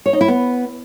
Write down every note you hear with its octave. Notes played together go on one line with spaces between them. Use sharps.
C#5
D#4
E4
B3